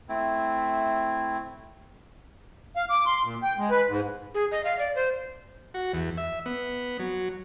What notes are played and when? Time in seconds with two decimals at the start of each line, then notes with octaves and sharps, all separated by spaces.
0.09 A3 C4 E4
2.76 F5
2.90 D6
3.06 C6
3.24 A#2
3.43 G5
3.58 G#3
3.71 B4
3.88 G#2
4.34 G#4
4.52 D#5
4.65 F5
4.79 D5
4.95 C5
5.74 F#4
5.93 E2
6.18 E5
6.46 B3
7.00 F#3